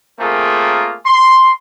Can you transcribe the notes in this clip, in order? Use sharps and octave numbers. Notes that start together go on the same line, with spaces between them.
A3 A#3 C4 F4 G#4 A#4
C6